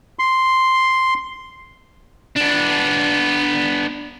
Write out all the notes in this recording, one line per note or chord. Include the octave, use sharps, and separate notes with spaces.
C6
B3 D4